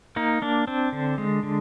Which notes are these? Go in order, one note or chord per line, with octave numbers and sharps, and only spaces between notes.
A#3 D#4
A#3 D4
C4 D4
D3
G#3
D3